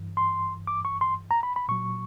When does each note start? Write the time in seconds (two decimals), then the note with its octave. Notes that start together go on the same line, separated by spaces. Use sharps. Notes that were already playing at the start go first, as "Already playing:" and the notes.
Already playing: G2 E3
0.17 C6
0.67 D6
0.85 C#6
1.01 C6
1.31 A#5
1.43 B5
1.56 B5
1.68 A#2 F#3 C#6